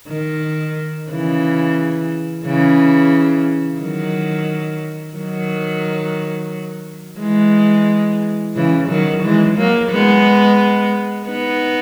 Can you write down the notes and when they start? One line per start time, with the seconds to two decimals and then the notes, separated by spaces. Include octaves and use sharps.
0.09 D#3
1.10 C#3 E3
2.46 C#3 E3
3.81 D#3 F#3
5.16 D#3 F#3
7.20 E3 G#3
8.56 C#3 E3
8.89 D#3 F#3
9.23 E3 G#3
9.57 F#3 A#3
9.92 G#3 B3
11.27 B3 D#4